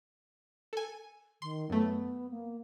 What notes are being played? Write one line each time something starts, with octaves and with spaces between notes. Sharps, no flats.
A4 G#5
D#3 C6
F#2 A3 B3
A#3